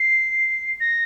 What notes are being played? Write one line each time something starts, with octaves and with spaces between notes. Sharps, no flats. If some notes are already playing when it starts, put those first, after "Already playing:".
Already playing: C7
A#6